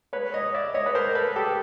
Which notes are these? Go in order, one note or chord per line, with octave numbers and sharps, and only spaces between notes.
B4 C#5
C#5 D#5
D5 E5
C#5 D#5
B4
A#4 C5
A4 B4
G4 A4